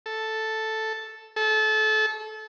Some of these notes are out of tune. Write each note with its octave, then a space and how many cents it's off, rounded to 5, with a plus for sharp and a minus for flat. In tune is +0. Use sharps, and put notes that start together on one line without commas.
A4 +0
A4 -25